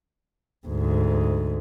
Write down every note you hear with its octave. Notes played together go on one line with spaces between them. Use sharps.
D2 G#2